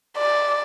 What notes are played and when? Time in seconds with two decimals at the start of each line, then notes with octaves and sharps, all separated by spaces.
0.18 D5